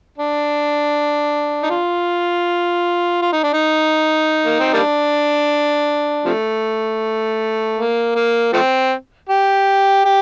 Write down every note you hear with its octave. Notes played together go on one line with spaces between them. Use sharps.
D4
D#4
F4
F4
D#4
D4
D#4
A#3
C4
G3 A#3 D4
C3 F3 A3
A#3
A#3
F3 A3 C4
G4
G4